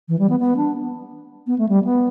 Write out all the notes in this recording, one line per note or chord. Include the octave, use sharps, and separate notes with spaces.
E3
G3
B3
B3
D4
B3
A3
G3
B3